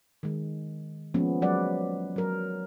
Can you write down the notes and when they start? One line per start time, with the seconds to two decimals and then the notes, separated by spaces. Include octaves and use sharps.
0.23 D#3 G#3
1.14 F3 G#3 A#3 B3 C#4
1.42 F#3 G#3 B4 D5 F#5
2.16 F#3 A#4